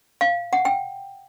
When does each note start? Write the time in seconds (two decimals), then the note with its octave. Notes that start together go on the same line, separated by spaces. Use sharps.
0.21 F5
0.53 F#5
0.65 G5